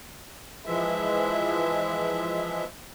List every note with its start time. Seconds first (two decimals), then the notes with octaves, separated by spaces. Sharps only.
0.66 E3 F3 G#3 E5